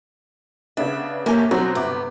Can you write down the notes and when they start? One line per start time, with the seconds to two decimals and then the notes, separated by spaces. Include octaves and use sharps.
0.77 C#3 B3 D4 E5
1.26 A#1 A#3 G4 C#5 G#5 A5
1.51 B2 F#3 C4 F#4
1.75 G1 C3 B3 D6